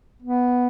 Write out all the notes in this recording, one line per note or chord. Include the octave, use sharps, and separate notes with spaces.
B3